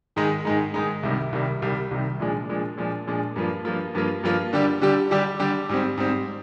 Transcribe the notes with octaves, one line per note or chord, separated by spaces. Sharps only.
G#2 D#3 G#3 D#4
G#2 D#3 G#3 D#4
G#2 D#3 G#3 D#4
C2 C3 D#3 G3
C2 C3 D#3 G3
C2 C3 D#3 G3
C2 C3 D#3 G3
A#2 F3 G#3 D4
A#2 F3 G#3 D4
A#2 F3 G#3 D4
A#2 F3 G#3 D4
G2 F3 A#3 F4
G2 F3 A#3 F4
G2 F3 A#3 F4
G2 F3 A#3 F4
D3 G3 D4 G4
D3 G3 D4 G4
D3 G3 D4 G4
D3 G3 D4 G4
G#2 G3 C4
G#2 G3 C4